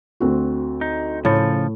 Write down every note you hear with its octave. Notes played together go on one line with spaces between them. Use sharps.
D2 C4 F#4
D#4
A2 C#3 F3 A4